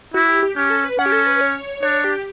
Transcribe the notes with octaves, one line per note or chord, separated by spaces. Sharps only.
E4 F#4
G4
G4
C#4 G4
A4
B4
C#4 F#5
G4
A4
B4
C#5
D4 C#5
G4